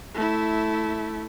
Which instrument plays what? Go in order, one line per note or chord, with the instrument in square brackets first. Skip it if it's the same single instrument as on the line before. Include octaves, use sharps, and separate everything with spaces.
[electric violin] A3 E4